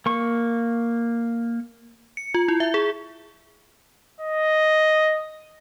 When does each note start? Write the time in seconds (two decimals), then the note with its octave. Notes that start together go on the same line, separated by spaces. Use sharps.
0.06 A#3 C#6
2.17 C#7
2.34 F4
2.48 E4
2.60 E5
2.74 G#4
4.20 D#5